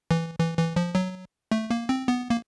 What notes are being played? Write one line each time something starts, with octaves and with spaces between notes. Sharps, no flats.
E3
E3
E3
F3
F#3
A3
A#3
C4
B3
A#3